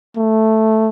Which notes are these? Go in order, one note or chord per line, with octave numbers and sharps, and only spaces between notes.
A3